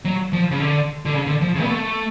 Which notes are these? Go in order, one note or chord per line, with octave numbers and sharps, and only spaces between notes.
F#3
F3
C#3
D3
D3
C#3
D3
F3
C#3
B3
A3